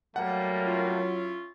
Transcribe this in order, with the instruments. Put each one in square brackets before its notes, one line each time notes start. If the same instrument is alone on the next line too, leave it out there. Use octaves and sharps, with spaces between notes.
[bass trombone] F#3 [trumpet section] G3 A3 A#3 [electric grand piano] F#5
[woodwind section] C#4 E4 F4